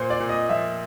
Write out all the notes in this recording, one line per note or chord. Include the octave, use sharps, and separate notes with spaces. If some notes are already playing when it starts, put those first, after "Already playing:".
Already playing: A#2 C5
D5
A#2
D#5
F3 E5